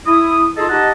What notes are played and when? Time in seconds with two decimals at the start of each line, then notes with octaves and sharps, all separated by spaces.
0.06 E4 D#6
0.58 D#4 F4 G#4 A4 D#5
0.69 D#4 G4 D#5 F#5 A5